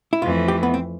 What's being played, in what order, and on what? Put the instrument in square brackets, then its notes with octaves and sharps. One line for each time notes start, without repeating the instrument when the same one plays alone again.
[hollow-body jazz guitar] E4
[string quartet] F2 E3 A3 [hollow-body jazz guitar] F4
[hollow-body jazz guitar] G4
B3
C4